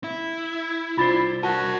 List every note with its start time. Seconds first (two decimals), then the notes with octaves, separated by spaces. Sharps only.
0.04 E4
0.97 C2 D4 F4 C5 B5 A6
1.43 F#4 A#4 F#5 A5